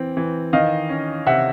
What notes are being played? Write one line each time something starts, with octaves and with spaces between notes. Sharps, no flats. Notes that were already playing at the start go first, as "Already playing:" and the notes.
Already playing: E3 C4
E3
D#3 D#5 F5
C#4
C3 E5 F#5